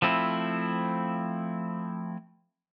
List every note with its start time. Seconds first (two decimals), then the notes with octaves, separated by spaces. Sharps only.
0.02 F3 A3 C4 E4